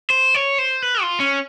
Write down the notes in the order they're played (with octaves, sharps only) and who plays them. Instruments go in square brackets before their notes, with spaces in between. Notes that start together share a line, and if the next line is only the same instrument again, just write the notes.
[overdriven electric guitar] C5
C#5
C5
B4
F4
C#4